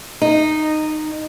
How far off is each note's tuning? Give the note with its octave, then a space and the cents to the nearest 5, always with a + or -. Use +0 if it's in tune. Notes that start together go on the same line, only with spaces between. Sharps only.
D#4 -15